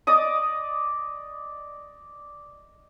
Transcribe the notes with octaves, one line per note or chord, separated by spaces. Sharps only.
D5 D#5 D6 D#6